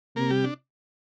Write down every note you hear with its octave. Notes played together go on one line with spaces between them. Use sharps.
C3 A#3 A#4
G3 G4
D4